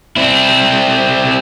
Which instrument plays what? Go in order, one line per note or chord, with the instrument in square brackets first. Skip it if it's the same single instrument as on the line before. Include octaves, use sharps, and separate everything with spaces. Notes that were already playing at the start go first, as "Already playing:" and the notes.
[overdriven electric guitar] C4 E4